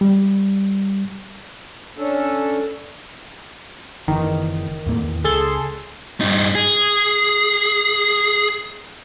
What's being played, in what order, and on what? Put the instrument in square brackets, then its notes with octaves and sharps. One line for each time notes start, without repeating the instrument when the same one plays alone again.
[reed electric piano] G3
[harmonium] C#4 D4 A4
[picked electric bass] F#1 E3 [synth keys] D#3
[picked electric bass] D#2 A2 A#3
E2
[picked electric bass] C#2 [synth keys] G#4 A4 C6
[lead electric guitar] G2 D#4
G#4